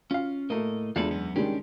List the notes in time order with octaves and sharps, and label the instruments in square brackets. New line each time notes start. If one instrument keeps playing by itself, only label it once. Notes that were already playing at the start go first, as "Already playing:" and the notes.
[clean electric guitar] C#4 [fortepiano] F4 F5
[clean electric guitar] A2 D#5 [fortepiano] A3 A#3
[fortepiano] E2 D3 G#3 [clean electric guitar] F4 A4 B4
[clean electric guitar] F#2 B3
[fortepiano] D#3 G3 G#3 [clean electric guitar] C#4 D4